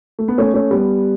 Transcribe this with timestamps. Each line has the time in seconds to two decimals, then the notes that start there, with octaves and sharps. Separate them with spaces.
0.19 A3
0.28 B3
0.38 A3 C#4
0.54 A3 C#4
0.71 G3 B3